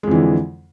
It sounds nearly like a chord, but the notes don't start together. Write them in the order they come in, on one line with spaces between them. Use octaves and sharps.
G#3 F2 E3 D3